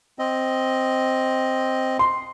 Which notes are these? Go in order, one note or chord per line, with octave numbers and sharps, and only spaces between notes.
C4 D#5
C6